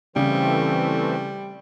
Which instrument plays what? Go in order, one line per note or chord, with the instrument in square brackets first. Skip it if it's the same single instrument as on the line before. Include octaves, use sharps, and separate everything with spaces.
[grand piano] C#3 [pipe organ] E3 A3 C4 [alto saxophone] G3